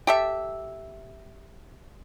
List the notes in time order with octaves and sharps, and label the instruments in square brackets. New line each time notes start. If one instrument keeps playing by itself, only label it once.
[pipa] G4 A4 E5